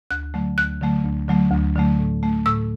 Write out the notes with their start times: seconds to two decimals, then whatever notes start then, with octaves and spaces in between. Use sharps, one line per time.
0.11 D2 F#6
0.34 D3 F#3 A3
0.58 D2 F#6
0.81 D3 F#3 A3
1.05 D2
1.28 D3 F#3 A3
1.51 D2
1.75 D3 F#3 A3
1.99 A2
2.23 A3
2.46 A2 E6